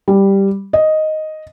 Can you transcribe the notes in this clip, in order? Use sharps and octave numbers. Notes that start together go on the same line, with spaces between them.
G3
D#5